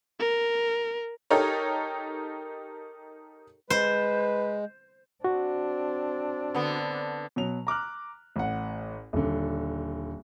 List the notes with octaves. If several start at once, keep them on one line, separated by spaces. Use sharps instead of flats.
A#4
D#4 G4 A4 A#4 C#5
G#3 B4 C5
C4 D4 F#4
D3 B3
B2 F#3 F7
A#5 D6 F6 F#6
A1 F#5
D#1 D3